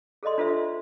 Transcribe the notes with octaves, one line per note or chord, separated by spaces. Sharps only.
G#4 A4 D5 D#5 C6
D4 F4 A4 B4 C5 E5